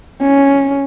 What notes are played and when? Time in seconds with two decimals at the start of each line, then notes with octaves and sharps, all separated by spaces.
0.21 C#4